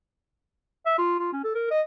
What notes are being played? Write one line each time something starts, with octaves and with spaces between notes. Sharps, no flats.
E5
F4
F4
C#4
A4
A#4
D#5